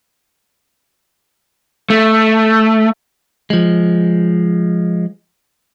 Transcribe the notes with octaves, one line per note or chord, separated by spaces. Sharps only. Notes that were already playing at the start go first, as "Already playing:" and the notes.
A3
F3 G#3